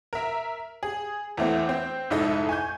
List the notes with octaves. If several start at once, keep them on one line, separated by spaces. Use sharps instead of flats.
A#4 E5
G#4
E2 E3 A3 C4
C4
F1 G#2 D#4 E4 A4 D#5
G#5 C#6 G6